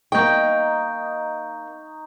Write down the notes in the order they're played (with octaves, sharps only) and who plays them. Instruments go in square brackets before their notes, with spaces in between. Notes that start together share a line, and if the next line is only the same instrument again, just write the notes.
[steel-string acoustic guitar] A#3 G5 [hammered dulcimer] D#4 [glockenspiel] C#6 G6